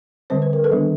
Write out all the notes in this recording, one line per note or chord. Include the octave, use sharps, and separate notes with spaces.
D3 G3 C4 C5
B4
A#4
A4 B4
D#3 G3 B3 D4